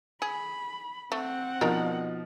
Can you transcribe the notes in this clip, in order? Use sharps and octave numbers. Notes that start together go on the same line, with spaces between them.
G#4 B5
A3 C4 F#5
B2 D#3 F3 D4 D#4 A#4